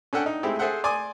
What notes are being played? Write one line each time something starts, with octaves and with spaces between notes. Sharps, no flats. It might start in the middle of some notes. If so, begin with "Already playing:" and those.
C#4 D4 A4 F#5 G5
D#4
G#3 A3 C4 E4 G4
G#4 A4 C5 E5 F#5 G5
D5 G#5 C6 D6 D#6